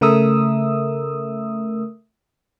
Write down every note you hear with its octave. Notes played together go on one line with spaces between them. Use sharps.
C#3 A3 A#4 E5 D#6 E6